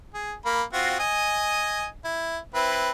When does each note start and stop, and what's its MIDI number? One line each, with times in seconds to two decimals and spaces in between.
0.14 0.33 68
0.45 0.63 58
0.45 0.63 83
0.73 0.98 60
0.73 0.98 65
0.73 0.98 66
0.99 1.87 75
0.99 1.87 80
2.04 2.38 64
2.54 2.91 60
2.54 2.91 64
2.54 2.91 71